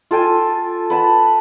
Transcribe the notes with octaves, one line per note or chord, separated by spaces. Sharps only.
F4 A4 G5 G#5
B4 F#5 A5